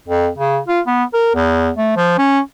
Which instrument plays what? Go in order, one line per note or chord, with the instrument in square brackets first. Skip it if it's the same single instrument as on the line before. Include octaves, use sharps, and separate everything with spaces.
[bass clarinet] F2
C#3
F4
B3
A#4
E2
A3
F3
C#4